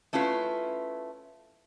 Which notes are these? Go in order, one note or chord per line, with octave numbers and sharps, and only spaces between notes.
A3 C#4 E4 F4 B4